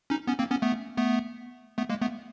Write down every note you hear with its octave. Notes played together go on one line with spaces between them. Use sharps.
C#4 D#4
B3 C#4
A#3 C4
B3 C#4
A3 B3
A3 B3
A3 B3
G#3 A#3
A3 B3